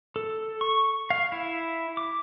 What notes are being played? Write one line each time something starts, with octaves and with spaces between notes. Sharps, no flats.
A4
C#6
F5
E4
D6